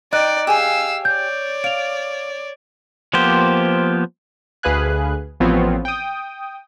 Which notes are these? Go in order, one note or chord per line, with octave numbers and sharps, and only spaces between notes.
D#4 D5 D#5 G5 F#6
G4 G#4 F5 G#5 E6
C#5 D5 G6
F5 D7 F7
F3 A#3 B3 G4 C5
D2 G#4 B4 F5 G#5 F#6
A1 F3 B3 C4 F4 C#5
G5 D#6